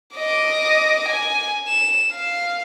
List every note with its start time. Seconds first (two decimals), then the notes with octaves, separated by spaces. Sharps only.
0.16 D#5 D6
1.09 G#5
1.67 E7
2.13 F5